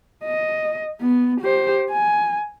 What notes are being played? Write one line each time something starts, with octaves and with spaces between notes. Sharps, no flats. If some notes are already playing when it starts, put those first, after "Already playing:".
D#5
B3
G4 C5
G#5